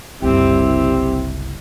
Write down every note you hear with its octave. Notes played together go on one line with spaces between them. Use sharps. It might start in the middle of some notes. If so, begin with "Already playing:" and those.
F#1 C2 G3 C4 E4 G4